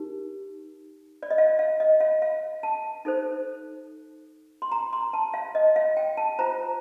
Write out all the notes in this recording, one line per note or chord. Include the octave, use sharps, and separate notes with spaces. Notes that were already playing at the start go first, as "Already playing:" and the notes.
Already playing: D#4 G4 A#4
D5
D#5
F5
F5
D#5
F5
F5
A5
D#4 A4 C5
C6
A#5
C6
A5
F5
D#5
F5
G5
A5
F4 C5 A#5